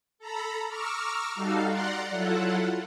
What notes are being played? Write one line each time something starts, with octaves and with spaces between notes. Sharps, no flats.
A4 A#5 B5
A#5 C#6 D6 E6 F6
G3 D#4 F#4 A4 F5
D5 F#5 A#5 C6
F#3 E4 F4 A4 F#5